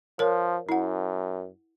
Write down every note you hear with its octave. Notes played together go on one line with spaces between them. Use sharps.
F3 A#4 C#5
F#2 E4 F#5